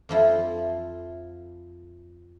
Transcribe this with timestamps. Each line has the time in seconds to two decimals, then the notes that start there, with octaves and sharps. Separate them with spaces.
0.09 F2 F3 E4